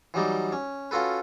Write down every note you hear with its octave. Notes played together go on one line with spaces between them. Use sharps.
E3 F#3 G3 D#4 D5
C#4
C#4 F4 F#4 A4 B4